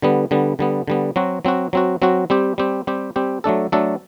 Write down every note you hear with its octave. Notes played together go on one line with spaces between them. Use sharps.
D3 G3 B3
D3 G3 B3
D3 G3 B3
D3 G3 B3
F#3 C4 F#4
F#3 C4 F#4
F#3 C4 F#4
F#3 C4 F#4
G3 C4 G4
G3 C4 G4
G3 C4 G4
G3 C4 G4
F#3 A3 D4 A4
F#3 A3 D4 A4